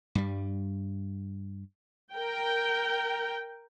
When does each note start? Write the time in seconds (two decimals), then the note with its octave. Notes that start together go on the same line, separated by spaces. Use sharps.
0.15 G2 G3
2.12 A#4 G5